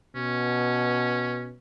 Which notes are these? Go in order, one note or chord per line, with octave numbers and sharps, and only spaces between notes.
B2 C#4